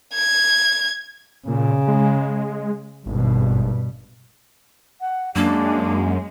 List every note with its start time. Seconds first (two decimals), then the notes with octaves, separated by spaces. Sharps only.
0.14 G#6
1.47 A#2 C#3
1.88 G#3
3.06 G#1 G2 B2
5.01 F#5
5.35 F#2 G#3 A#3 D4